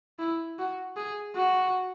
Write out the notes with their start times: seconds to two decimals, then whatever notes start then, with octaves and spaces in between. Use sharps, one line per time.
0.19 E4
0.59 F#4
0.97 G#4
1.36 F#4